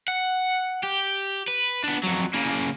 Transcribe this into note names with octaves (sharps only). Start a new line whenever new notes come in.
F#5
G4
B4
B3 D4
F2 F#3
C#3 A#3